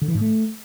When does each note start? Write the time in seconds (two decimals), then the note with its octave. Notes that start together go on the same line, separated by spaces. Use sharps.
0.02 D3
0.08 E3
0.15 G#2
0.21 A3